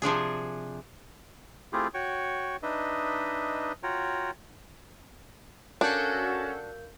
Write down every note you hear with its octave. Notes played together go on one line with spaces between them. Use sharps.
C3 F3 D4 G#4
A3 C4 E4 F4 G4 G#4
F#4 C#5 G5 C#6
D4 D#4 B4 D#5 E5
F4 F#4 C#5 G5 A#5
C#4 D4 F#4 A4 A#4 F5 G6